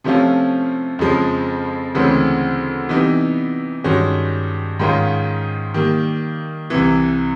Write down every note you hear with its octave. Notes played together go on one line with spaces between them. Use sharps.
C3 F3 A3 C#4 F4
F2 C#3 F3 G#3
D2 C#3 E3 G#3 C4
C3 E3 G3 B3 D#4
G2 D#3 G#3 C#4 F#4
G#2 D#3 G#3 C#4 F4
D#3 G3 A#3
C2 C3 E3